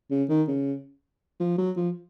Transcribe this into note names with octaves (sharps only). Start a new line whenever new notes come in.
C#3
D#3
C#3
F3
F#3
F3